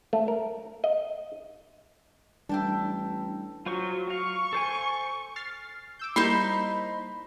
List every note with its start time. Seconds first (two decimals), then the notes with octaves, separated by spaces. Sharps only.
0.13 A3
0.28 A#4
0.84 D#5
2.49 A1 G3 D4 E4 G5 A5
3.66 F#3 F4 C5 C#6
4.10 F5 C#6
4.53 A4 C5 G#5
5.36 F6 A6 C7
5.99 D6 E6 G6
6.16 G3 A#3 D#4 E4 C5 B5 C6